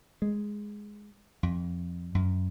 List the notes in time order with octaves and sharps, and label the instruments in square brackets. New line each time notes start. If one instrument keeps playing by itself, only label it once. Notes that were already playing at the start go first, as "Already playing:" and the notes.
[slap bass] G#3
F2
F#2